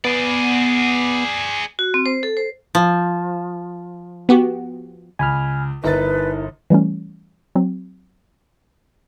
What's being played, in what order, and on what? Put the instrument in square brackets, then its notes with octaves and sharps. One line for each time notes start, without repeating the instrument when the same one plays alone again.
[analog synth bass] B3 [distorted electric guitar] G#4 D5
[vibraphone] F#4
C4
C5
A4
C5
[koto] F3
[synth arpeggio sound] B3 F#4 G4
[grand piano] C#2 [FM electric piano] G#5 B5 F6
[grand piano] G1 A6 [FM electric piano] D#4 E4 A#4 [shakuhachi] B4
[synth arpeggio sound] E3 G3 A3 C#4
F#3 C4